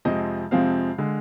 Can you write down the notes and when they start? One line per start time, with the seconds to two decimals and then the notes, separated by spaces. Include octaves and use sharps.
0.05 F2 C3 F3 G#3 C4 D#5
0.51 F2 C3 F3 G#3 C4 F5
0.98 D3 G#3